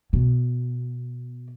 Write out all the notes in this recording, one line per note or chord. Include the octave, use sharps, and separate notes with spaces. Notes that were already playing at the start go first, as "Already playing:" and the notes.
B2